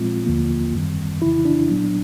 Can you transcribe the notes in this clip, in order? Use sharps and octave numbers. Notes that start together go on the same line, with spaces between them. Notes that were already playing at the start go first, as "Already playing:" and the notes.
Already playing: A#2 F3 G#3 C4 F4
D#2 D3 F3 A#3
F#2 D#3 G3 C4
F2 C#3 E3 E4
D4
A#2 F#3 B3